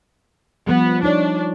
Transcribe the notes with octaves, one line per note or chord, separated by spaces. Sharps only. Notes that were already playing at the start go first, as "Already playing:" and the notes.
F3 G3 B3
D4 D#4 C#5